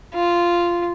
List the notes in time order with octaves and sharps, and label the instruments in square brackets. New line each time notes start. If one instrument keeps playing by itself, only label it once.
[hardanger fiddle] F4